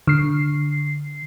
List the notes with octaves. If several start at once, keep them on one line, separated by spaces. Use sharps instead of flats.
D3 C7